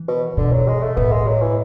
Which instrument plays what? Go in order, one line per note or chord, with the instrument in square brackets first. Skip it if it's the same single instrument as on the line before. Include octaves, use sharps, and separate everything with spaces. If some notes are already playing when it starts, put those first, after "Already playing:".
Already playing: [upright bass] E3
[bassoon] B2
[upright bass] B2 [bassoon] D3
[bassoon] F#3
G#3
A3
[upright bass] A2 [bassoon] B3
[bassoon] G#3
F#3
E3